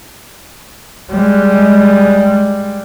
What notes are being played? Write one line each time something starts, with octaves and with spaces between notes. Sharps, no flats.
G3 G#3